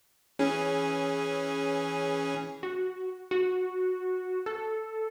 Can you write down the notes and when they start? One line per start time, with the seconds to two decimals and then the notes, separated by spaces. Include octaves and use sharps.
0.39 E3 C#4 G#4
2.63 F#4
3.31 F#4
4.46 A4